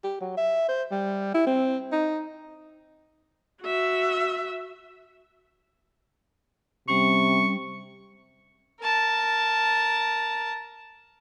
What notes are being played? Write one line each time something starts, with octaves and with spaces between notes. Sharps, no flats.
G4
F#3
E5
C5
G3
E4
C4
D#4
F#4 E5
C3 G3 C#4 C#6
A#4 A5